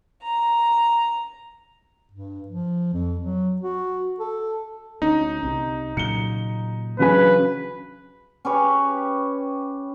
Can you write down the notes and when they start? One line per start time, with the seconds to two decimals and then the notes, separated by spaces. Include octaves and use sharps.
0.24 A#5
2.12 G2
2.48 F3
2.93 F2
3.19 F#3
3.62 F#4
4.20 A4
5.02 D2 C#4 D#4
5.43 C2 C3
5.97 A#2 C#3 F#3 C#7 G7
6.99 C#3 E3 F#3 D4 B4 G#5
8.45 C#4 G4 B4 C#5